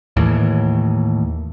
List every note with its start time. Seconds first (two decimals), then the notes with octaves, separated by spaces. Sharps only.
0.17 D#2 A2 E3